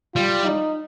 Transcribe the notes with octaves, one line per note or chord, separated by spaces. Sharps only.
G3 F4
D#4